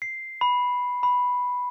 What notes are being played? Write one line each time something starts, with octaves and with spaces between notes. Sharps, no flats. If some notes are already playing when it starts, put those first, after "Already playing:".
C7
B5
B5